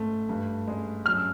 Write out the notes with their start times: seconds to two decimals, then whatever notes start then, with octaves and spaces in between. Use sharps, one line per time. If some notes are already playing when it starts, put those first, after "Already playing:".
Already playing: G#2 A3
0.29 G2
0.67 G#3
1.06 F#2 F6
1.17 E6